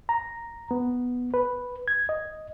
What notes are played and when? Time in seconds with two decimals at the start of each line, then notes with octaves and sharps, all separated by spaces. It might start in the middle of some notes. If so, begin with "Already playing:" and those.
0.09 A#5
0.71 B3
1.34 B4
1.88 G#6
2.09 D#5